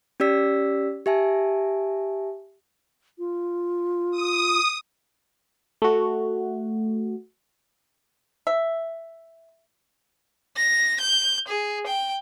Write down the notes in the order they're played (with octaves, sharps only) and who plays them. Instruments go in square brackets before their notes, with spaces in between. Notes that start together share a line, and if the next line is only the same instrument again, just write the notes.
[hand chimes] C#4 G4 D5 E6 B6
G4 E5 G#5 A5
[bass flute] F4
[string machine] D#6
[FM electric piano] A3 F#4
[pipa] E5
[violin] A#6
G6
G#4
G5